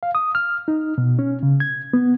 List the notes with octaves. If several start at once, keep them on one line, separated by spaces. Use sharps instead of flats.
F5
D#6
F6
D#4
B2
C#4
C#3
G#6
B3